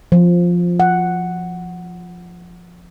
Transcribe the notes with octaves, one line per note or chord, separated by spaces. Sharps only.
F3
F#5